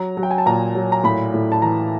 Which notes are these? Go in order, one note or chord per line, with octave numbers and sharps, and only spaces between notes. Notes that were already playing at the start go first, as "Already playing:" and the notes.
Already playing: F#3 A#5
F#3
G5
G#5
A5
A#2 A#5
F#3
A#5
A2 B5
A2
A5
E3 A#5